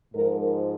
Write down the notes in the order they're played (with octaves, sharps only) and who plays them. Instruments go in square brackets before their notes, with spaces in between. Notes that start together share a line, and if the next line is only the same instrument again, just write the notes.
[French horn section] G#2 F3 A#4